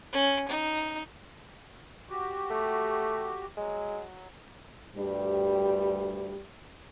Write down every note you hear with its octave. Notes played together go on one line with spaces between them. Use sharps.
C#4
D#4
F#4 G4
A3
F#3 G#3
D2 G2 G3 G4